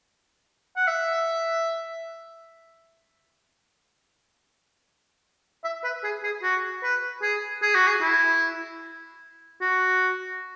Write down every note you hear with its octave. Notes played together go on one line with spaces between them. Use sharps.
F#5
E5
E5
B4
G#4
G#4
F#4
B4
G#4
G#4
F#4
G#4
E4
F#4